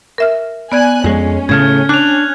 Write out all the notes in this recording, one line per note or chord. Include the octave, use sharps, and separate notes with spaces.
A#4 E5 F6
B3 D5 G#5 F#6 G#6
F2 G#3 C#4
A2 C#3 A3 F6 G#6
D4 D6 F#6 F7